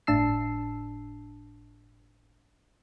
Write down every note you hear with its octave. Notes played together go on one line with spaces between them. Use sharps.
G1 A2 D4 A5 E6 C7